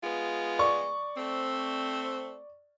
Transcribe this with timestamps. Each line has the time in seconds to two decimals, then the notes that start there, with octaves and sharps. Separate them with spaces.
0.04 G#3 B3 F4
0.59 D5 C#6
1.16 A3 C4